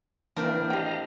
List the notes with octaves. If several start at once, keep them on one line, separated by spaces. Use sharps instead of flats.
A2 E3 A#3 C4 D4 A#4
G4 D#5 F5 G5 A#5